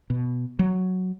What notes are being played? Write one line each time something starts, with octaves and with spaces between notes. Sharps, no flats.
B2
F#3